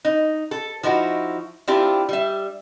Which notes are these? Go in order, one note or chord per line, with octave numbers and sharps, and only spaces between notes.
D#4
A4
F3 D#4 E4 F#4
C4 D4 E4 F4 G4
G3 E5